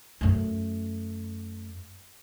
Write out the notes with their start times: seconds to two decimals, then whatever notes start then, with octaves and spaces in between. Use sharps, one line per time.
0.21 F#2 A3